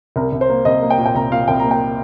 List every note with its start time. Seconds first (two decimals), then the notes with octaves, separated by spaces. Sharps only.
0.16 C2 A#4
0.32 C2
0.41 C5
0.49 A#3
0.65 C2 D#5
0.82 A#3
0.90 G5
0.98 A#2
1.06 G5
1.15 C2 A#5
1.31 A#2 F5
1.48 C2 G5
1.59 A#3 A#5
1.71 G5